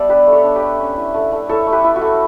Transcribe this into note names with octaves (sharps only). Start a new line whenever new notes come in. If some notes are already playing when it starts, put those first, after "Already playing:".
Already playing: G3 B3 D5 E5 A5
D4 G4 B4
A3
A4 C#5
D4
G4 B4
A3
C#4
E4
A3
A3
E4 A4 C#5
A3
G4 B4
E4
F#4
A3